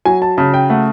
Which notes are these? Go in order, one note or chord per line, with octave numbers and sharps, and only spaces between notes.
F#3 G#5
A5
C#3 A5
G5
A3 F#5